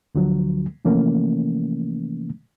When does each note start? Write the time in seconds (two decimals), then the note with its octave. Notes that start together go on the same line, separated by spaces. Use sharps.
0.15 D2 D3 F3 F#3
0.85 C3 E3 F3 A3 A#3 C#4